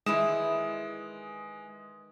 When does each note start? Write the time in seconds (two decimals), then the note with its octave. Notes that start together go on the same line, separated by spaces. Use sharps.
0.06 D#3 E3 G#3 E4 D#6 E7